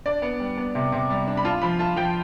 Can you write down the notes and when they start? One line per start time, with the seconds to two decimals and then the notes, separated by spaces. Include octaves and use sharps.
0.06 D4 D5
0.22 B3
0.40 G3
0.58 B3
0.75 C3
0.92 C3
1.10 G3
1.27 D4
1.37 B5
1.45 F4 A5
1.62 F3 B5
1.79 F4 A5
1.96 F3 G5